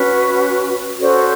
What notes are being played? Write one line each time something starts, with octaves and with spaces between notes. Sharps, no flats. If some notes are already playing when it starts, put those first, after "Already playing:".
Already playing: C#4 F#4 B4
C#4 F#4 A4 C5 D5
C#5